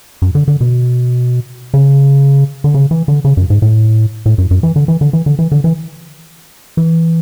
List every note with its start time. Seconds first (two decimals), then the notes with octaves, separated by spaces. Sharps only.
0.22 F#2
0.35 D3
0.48 D3
0.61 B2
1.74 C#3
2.64 D3
2.74 C#3
2.91 E3
3.08 D3
3.25 C#3
3.37 F#2
3.50 G#2
3.62 A2
4.26 A2
4.38 F#2
4.51 F#2
4.63 E3
4.76 D3
4.88 E3
5.01 D3
5.13 E3
5.26 D3
5.39 E3
5.52 D3
5.64 E3
6.77 E3